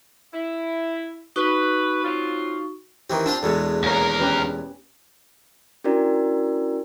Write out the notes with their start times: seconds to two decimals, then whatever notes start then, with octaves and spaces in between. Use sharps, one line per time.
0.34 E4
1.36 D#4 F#4 B4 C#6
2.04 F#3 C4 F4
3.10 D#3 E3 C4 G4
3.26 C4 D4 F4 C5
3.43 E2 B2 G#3 A4
3.83 D#2 A#3 G#4 A#4 C#5
4.20 C#4 G4 B4
5.84 C#4 D4 E4 F#4 A#4 D5